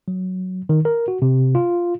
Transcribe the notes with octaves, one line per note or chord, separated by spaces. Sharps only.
F#3
D#3
A#4
F#4
C3
F4